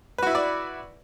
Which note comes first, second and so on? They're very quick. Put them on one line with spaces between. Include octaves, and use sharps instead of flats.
B4 F#4 E4 E5 D5